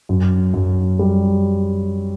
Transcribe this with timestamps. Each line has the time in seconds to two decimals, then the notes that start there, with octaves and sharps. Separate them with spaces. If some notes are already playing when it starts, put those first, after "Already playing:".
0.09 F#2
0.54 F#2
0.99 G3